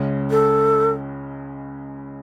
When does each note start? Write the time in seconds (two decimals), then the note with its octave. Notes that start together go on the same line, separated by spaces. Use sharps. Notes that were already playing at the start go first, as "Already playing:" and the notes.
Already playing: C#2 C#3 G#3 C#4
0.31 A4